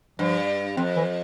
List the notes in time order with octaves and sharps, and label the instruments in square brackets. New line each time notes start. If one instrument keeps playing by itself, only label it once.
[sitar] G2 [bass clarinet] F3
[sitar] F2 [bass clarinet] C4
[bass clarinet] E3